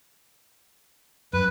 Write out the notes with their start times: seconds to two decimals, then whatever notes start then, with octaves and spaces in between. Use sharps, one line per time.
1.33 F#2 B4